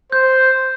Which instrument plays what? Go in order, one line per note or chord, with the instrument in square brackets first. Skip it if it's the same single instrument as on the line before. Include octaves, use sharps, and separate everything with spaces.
[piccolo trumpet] C5 [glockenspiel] G6